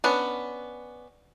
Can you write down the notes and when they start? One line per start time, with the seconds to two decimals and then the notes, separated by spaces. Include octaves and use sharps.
0.04 B3 C#4 D4 B4